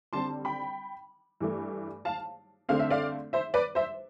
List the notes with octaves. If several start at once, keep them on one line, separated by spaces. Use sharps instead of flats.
D3 G3 C4 A5 C6
G5 B5
G2 E3 A3
F5 A5
D3 A3 C4 F5
E5
D5 F5
C5 E5
B4 D5
C5 E5